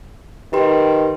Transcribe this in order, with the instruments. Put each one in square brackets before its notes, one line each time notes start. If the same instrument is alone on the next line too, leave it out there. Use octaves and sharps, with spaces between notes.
[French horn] D#3 [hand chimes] G4 B4 C6